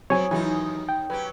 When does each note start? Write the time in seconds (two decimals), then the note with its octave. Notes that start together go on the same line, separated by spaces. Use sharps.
0.10 D#3 F#3 B3 C4 C#5 G#5
0.31 D#2 D#3 E3 F#3 D#4
0.89 G5
1.10 F#3 C#4 G4 B4